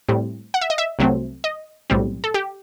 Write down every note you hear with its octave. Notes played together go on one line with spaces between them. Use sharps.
A2 G3 C4
F#5
E5
D#5
E5
C2 C3 F#3 A3 C4
D#5
B1 A2 G3 C4
A4
G4